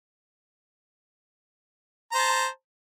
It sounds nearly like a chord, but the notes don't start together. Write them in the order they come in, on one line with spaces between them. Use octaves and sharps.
A#5 C5 A5